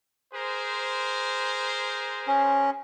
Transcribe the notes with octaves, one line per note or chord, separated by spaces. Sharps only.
G#4 A#4 C5
C#4